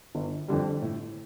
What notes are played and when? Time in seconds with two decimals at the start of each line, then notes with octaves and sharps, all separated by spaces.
0.15 G1
0.48 F2 D3 G3
0.82 A2